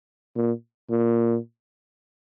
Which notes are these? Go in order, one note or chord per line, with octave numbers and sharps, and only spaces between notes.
A#2
A#2